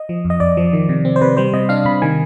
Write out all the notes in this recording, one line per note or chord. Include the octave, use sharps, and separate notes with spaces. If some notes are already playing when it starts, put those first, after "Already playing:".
Already playing: D#5
F3
F2
D#5
F2 D5
F3
D#3
C3
C4
C5
C3 B4
G3 C5
C3 D#5
D4 F5
C3 B5
D#3 G#5